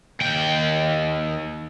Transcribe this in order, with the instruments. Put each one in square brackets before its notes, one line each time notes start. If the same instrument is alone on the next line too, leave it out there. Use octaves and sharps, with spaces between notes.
[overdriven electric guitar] D#2 G5